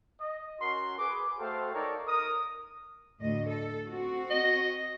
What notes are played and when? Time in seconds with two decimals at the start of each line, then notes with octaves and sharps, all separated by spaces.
0.20 D#5
0.61 C#4 F#4 A#4 C6
0.98 G#4 B4 D6
1.39 A3 F#4 A4 C5 F5 G5
1.73 D#4 A4 A#4 C#5 D5 F5
2.08 A#4 D#6
3.20 D2 A2 D#5
3.49 A4
3.87 C4 F#4
4.30 D#5